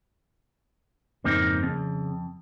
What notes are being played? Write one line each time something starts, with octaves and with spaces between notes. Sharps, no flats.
F2 G#2 C#3 A#3 C4 D#4
F2 C#3